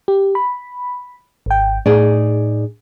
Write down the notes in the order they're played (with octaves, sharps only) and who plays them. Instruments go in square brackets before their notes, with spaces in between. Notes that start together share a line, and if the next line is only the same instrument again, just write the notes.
[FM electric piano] G4
B5
G#1 G5
[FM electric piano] A2 [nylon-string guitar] D#4 G#4 D5